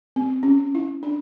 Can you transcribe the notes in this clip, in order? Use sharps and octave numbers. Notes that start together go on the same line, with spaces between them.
C4
C#4
E4
D4